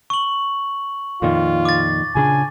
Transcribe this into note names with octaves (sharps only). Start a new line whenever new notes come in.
C#6 F#7
F2 A#2 D#3 F4
D6 A6
A#2 C#3 D4 G#5